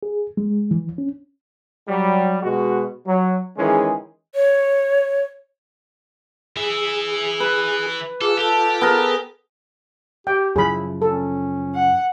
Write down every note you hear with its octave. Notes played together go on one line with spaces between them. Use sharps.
G#4
G#3
E3
C#4
F#3 G3
B2 G#3 F#4
F#3
D#3 E3 G#3 C#4 G#4
C#5
E3 G#4 E5
B4
F4 G#4 A4 D6
G4 A4
B3 G#4 A#4
G4 G5
F#2 C#3 F3 E4 G#4 B5
C#4 A4
F#5